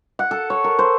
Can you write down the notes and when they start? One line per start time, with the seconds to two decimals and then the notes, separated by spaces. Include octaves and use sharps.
0.19 F#5
0.31 A4
0.50 C#5
0.64 A#4
0.79 C5